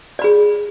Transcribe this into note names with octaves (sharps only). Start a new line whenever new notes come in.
G#4 D5 B5